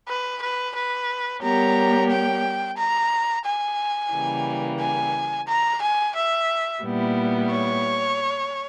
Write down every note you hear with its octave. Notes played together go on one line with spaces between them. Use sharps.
B4
B4
B4
G3 B3 G4 A#4 C#5 A#5
G5
A#5
G#5
C#3 E3 G3 A#3
G#5
A#5
G#5
E5
A#2 G3 B3 E4
C#5